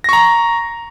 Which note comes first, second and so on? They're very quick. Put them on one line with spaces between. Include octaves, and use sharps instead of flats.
A#6 C#6 A#5